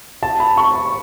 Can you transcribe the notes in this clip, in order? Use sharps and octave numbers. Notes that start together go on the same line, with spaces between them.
A5
B5
C#6